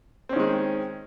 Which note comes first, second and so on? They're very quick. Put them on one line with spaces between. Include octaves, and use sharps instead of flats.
C4 C#4 D#3 G#3